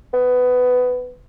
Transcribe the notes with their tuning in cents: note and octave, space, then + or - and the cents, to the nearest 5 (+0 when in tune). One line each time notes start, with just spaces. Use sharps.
B3 +15